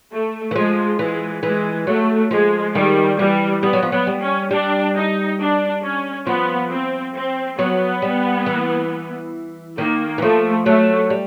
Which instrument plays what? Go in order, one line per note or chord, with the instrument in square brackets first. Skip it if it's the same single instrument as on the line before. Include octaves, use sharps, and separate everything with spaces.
[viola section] A3
[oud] E3
[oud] F3 [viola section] G#3
[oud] E3 [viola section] G#3
[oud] E3 [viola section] G#3
[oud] F#3 [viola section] A3
[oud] F3 [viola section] G#3
[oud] D#3 [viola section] G3
[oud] E3 [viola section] G3
[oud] G3 [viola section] B3
[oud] F#3
F3
[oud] F#3 [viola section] B3
[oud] G3
[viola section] C#4
[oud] G3 [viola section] D4
[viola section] D#4
D4
C#4
[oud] F3 [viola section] B3
[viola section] C4
C4
[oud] F#3 [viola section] B3
[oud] G3
E3
[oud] D#3 [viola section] A#3
[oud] E3
[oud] F3 [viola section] A3
[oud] F#3 [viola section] A3
[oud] G3